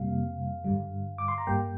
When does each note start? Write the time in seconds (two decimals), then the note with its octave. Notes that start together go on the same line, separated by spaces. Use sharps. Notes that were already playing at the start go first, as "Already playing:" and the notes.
Already playing: F2 C3 G3 A#3 F5
0.64 G2 D3 G3
1.18 D6
1.28 C6
1.38 A#5
1.47 G2 G3 A#3 G5